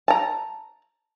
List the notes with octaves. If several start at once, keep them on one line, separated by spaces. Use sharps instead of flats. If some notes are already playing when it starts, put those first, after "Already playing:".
A5 A#5